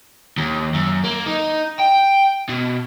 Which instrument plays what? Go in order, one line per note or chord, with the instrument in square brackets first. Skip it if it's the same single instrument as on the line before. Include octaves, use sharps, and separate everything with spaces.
[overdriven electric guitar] D#2
F#2
A#3
D#4
G5
B2